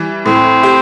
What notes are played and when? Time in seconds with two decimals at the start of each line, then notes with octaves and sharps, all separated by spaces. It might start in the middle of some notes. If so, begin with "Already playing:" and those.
Already playing: E3 G3
0.26 A2 C4
0.63 G4